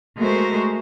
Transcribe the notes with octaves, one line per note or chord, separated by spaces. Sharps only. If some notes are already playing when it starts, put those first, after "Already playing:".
G#3 A3 F#4 A4 A#4 C5